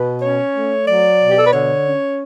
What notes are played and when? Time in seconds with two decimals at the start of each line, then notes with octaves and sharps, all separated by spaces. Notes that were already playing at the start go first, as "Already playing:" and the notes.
Already playing: B2 B4
0.22 C#4 C#5
0.54 A3
0.87 F#3 D5
1.21 B2
1.30 G4
1.38 A4
1.45 B4
1.53 D3 C#5
1.86 C#4